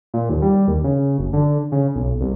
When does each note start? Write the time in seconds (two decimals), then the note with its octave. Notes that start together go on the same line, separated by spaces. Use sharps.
0.14 A#2
0.30 D#2
0.42 G3
0.68 D#2
0.84 C#3
1.18 F#1
1.33 D3
1.72 C#3
1.95 B1
2.21 C2